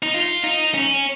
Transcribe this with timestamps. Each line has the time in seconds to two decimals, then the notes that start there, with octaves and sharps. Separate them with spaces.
0.03 D#4
0.14 F4
0.44 D#4
0.74 C#4